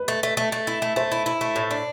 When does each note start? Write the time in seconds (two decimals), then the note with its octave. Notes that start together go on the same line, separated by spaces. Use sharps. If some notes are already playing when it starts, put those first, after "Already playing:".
Already playing: B4
0.08 A3
0.23 A3
0.37 A3
0.52 A3
0.67 E4
0.82 A3
0.96 A3 C5
1.12 E4
1.26 E4
1.41 A3
1.56 A2
1.71 D4